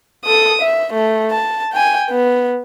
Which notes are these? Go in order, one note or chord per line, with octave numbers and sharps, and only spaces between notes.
A4 D#6
E5
A3
A5
G5 G#5
B3